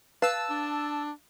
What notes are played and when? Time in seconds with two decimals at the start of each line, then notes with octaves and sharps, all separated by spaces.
0.22 B4 F5 A5 E6
0.50 D4